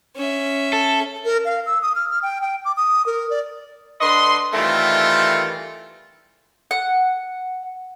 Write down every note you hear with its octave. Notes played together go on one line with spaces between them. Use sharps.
C#4 E5
A4
A#4
F5
E6
D#6
F6
F6
G5
G5
D6
D#6
A#4
D5
D3 D4 B4 D#5 C6
D#3 E3 G3 A3 C4 F4
F#5